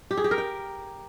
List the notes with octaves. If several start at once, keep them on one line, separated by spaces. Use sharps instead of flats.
G4
G#4
G4
A#4
G5